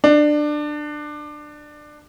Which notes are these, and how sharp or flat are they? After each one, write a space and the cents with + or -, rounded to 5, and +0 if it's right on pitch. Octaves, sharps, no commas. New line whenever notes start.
D4 +20